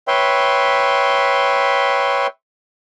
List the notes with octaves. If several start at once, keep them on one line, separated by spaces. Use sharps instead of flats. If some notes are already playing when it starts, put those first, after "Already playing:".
B4 C#5 E5 G5 C6